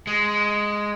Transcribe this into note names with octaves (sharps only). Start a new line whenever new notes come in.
G#3